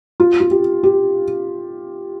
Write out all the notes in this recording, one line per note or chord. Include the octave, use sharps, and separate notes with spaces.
F4
F4
G4
G4